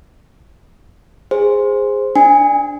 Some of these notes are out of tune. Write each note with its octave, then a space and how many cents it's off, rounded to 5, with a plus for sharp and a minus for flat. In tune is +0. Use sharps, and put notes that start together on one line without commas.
G#4 -15 C5 +0
D4 +0 G#5 -15